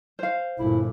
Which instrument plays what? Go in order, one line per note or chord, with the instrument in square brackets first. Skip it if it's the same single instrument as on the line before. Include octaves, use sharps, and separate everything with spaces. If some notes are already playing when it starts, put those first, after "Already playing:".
[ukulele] C5 F5
[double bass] G1 A#2 [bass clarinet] E4